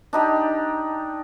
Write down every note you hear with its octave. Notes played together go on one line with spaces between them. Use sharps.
D4 D#4 G4